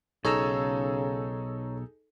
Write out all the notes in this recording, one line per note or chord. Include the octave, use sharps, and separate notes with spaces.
B1 C#3 D#4 G#4 A4 C#5 A#5 E6